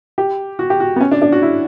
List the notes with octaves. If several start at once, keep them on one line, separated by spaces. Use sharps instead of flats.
G4
F#4
G4
F#4
B3
C#4
D4
D4
F#4
E4